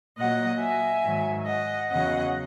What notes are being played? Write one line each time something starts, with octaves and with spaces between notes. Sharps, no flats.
A#2 F#3 D#5 F#5
E5 G#5
G#2 D#3 F#3
D#5 F#5
E2 C#3 F#3 D#5 F#5